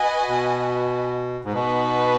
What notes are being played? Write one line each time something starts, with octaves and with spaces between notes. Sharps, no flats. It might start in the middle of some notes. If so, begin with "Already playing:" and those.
Already playing: F#4 B4 D#5 G#5
B2
G#2
B2 B3 D#4 B4